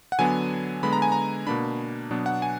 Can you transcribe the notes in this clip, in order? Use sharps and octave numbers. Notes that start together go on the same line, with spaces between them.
F#5
D3 F#3 B3 D4 G#5
D3 G#3 B3 B5
A#5
G#5
A#5
B2 A#3 D4 B5
B2 F#3 B3 D4
F#5
G#5